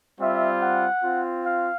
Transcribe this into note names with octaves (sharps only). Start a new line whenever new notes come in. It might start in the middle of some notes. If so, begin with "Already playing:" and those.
G3 C4 F4 E5
F#5
C4 F4
F5